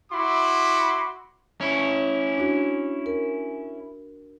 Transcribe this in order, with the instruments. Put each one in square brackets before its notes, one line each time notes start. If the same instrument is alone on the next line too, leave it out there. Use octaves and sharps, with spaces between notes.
[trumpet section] E4 F#4 B5 C6 D6
[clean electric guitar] C#4 E4
[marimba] D4 F#4
A#4